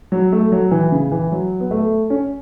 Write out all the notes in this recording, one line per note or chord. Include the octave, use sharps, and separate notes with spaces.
F#3
A3
F#3
E3
C#3
E3
F#3
B3
A3
C#4